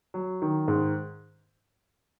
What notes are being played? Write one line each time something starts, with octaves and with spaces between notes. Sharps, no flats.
F#3
D#3
G#2